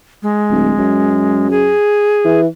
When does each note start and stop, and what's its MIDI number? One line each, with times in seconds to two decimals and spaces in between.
0.23 1.50 56
0.51 0.73 26
0.78 1.73 42
1.51 2.40 68
2.24 2.46 52